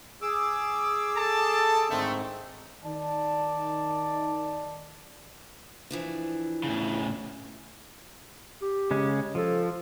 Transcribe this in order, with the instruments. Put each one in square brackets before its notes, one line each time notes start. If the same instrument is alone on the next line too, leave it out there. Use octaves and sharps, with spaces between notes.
[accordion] G#4 D6 E6
[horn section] A4 A5
[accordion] G#2 G#3 C4 [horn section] D3 D#3 A3
[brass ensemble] D#3 D#4 D5 A5
[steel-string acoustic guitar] E3 F3 D4
[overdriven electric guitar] A2 C#3
[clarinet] G4
[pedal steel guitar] C#3 G#3 C#4
[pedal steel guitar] F3 [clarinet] A4